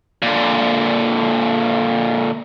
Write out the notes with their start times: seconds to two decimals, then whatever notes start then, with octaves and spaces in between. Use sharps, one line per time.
0.22 A#2 D3